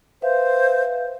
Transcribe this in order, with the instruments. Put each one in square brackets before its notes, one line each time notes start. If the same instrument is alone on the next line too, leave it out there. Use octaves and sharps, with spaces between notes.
[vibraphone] B4 E5 F5 [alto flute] C5